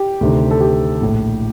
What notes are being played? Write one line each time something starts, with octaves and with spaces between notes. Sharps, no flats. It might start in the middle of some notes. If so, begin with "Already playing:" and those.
Already playing: G4
D2 C3 D#3
A4
G4
A#1 A2